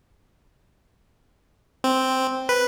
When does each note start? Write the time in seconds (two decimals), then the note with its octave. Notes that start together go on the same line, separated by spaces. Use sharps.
1.84 C4
2.49 B4